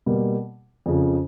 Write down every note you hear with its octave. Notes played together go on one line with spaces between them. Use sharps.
B2 G3 A#3
F2 C#3 F3